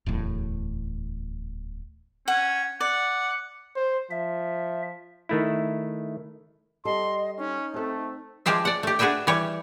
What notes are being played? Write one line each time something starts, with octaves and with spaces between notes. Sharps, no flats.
D1 E2 A2
C#4 F#5
D5 F#5
C5
F3 E5
D#3 A3 E4
G3 A4 D#5 C6
C#4 D#4
A3 C4 A4
F3 G#3 G4 C5 E5
D5 F#5
A3 G4
D4 F#4 G#4 B4 E5 G5
E3 G3 G4 C#5